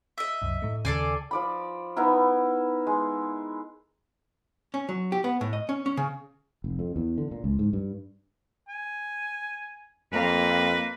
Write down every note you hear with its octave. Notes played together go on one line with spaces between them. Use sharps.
D#5 E5
C2 F#2
A2 A3
D#2 C#3 A4 D5 G#5 C7
F3 D5 B5
B3 D#4 E4 A#4
G#3
C#4
F#3
G4
B3
A2
D#5
C#4
C#4
C#3
F1
F2
E2
D3
A#2
C#2
G#2
G2
G#5
F2 A#3 B4